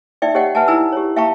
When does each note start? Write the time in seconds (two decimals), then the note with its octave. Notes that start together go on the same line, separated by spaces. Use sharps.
0.22 D#4 D5 E5 G5
0.35 G4 C#5 D#5 F#5 G5
0.55 B4 E5 F#5 G#5 A5
0.68 D#4 E4 G#5 A#5 E6
0.92 G4 C#5
1.16 E5 F5 G5 A5 A#5 C#6